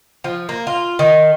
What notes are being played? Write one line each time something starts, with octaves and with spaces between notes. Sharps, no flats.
F3
A#3
F4
D#3